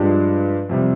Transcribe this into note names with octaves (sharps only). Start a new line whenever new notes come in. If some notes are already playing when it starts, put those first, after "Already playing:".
Already playing: G2 F3 G#3 D4 G4
F2 C3 G3